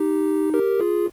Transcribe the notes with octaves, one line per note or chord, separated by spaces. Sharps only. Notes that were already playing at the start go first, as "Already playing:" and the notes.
Already playing: D#4 G4
G4 A#4
F4 G#4